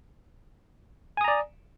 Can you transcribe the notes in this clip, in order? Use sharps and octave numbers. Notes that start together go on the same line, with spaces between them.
D5 G#5 A#5 D#6